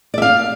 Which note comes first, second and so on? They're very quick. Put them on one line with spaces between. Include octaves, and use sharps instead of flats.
D5 E5 F5